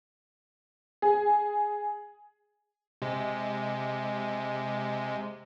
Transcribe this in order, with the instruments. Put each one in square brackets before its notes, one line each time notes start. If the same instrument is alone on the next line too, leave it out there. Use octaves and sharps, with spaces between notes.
[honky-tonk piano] G#4
[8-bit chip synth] C3 G#3